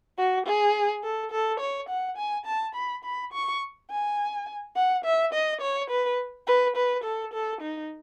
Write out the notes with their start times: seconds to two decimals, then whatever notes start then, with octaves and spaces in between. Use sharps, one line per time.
0.18 F#4
0.47 G#4
1.04 A4
1.31 A4
1.60 C#5
1.89 F#5
2.17 G#5
2.46 A5
2.75 B5
3.04 B5
3.33 C#6
3.90 G#5
4.76 F#5
5.05 E5
5.33 D#5
5.62 C#5
5.90 B4
6.47 B4
6.76 B4
7.04 A4
7.33 A4
7.61 D#4